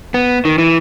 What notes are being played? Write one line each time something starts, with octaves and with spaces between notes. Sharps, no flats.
B3
D#3
E3